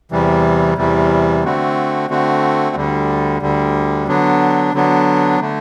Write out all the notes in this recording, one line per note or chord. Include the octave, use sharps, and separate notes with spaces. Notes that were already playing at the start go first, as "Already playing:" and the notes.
E2 C3 E3 G3
E2 C3 E3 G3
D3 A3 C4 F#4
D3 A3 C4 F#4
D2 D3 G3
D2 D3 G3
D3 F#3 B3 D4
D3 F#3 B3 D4
D3 A3